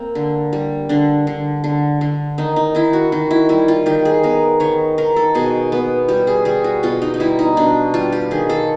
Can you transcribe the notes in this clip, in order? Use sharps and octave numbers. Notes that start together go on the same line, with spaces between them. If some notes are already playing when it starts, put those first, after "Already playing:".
Already playing: A#3 C4
D3
G3
D3 D4
D3
D3
D3
D#3 D#4
D#4
D#3 E4
F#4
D#3 F#4
E4
G3 E4
F4
D#3 G4
G#4
B3 A#4
D#3 C#5
D#3 A#4
A4
B2 G#4
B3
G3 G4
G#4
G3 G#4
F#4
B2 F4
D#4
D#4
G3 E4
D#4
B2 D4
G3 F4
G4
D#3 G#4
A4